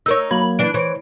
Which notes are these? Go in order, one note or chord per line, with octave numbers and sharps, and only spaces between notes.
D#4 A#4 C#5 E6
F#3 A#3 B5 G#6
E3 D4 D7
E3 C5 C#5